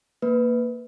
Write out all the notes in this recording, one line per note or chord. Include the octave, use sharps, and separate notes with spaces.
A#3 B4